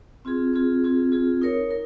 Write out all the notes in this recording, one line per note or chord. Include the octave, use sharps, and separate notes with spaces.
C4 F4 G#4
C4 F4 G#4
C4 F4 G#4
C4 F4 G#4
D#4 A#4 C#5
D#4 A#4